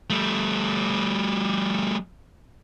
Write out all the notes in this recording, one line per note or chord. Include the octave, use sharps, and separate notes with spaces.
G3 A3